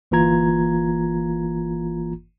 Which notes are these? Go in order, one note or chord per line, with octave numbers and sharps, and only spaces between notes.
G1 E3 A#3 F4 A#5 G#6